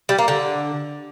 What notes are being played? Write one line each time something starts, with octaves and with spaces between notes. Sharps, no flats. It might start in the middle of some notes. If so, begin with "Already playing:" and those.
G3
A#3
D3